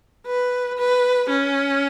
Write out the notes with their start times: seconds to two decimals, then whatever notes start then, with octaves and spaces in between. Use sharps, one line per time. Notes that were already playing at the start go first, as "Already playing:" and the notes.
0.26 B4
0.78 B4
1.29 C#4